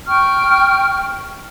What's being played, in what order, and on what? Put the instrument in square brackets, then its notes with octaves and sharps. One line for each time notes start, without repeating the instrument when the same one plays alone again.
[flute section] G5 C#6 F6